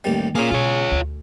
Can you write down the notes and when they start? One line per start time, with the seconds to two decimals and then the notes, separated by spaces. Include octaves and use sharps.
0.04 A1 D#2 G3
0.35 A#3 C#4 F4 G#4
0.51 B2 F4 C#5
0.91 D2